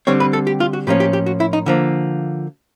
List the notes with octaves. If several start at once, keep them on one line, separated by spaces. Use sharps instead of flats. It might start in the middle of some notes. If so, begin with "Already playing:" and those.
D3 G3 C4 C#5
B4
A4
G4
F4
F#4
A2 F3 A#3 C#4 G4
G4
G4
F#4
E4
D#4
D3 F3 A#3